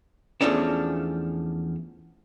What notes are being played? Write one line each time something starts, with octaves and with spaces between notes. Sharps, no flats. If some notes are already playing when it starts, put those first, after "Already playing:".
E2 A#2 F3 A3 C#4 D4